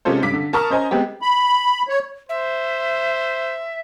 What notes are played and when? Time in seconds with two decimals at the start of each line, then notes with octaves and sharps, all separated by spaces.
0.05 C3 G#3 C#4 F4 A4 C5
0.22 G2 C#3 D6 B6
0.34 D3
0.53 A#4 A5 A#5 C#6 D#6 F6
0.70 C#4 C5 D#5 G#5 A#5
0.91 G#3 B3 C4 G4
1.22 B5
1.89 C#5
2.29 C5 E5